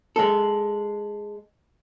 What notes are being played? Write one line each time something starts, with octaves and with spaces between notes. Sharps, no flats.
G#3 A4